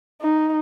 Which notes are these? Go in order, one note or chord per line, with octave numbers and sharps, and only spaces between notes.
D#4